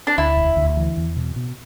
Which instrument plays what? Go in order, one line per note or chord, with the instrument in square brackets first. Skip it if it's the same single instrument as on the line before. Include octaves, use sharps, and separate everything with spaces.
[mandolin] D4
[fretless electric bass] D2 [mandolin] E4
[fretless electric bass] E1
D2
E3
E2
B2
B2